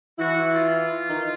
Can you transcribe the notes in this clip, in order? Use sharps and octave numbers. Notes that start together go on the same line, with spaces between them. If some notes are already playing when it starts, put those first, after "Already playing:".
E3 E4 F#4
F4
D#3 D#4